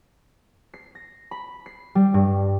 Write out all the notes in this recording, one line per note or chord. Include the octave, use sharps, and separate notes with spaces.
C7
A#6
B5
C7
G3
G2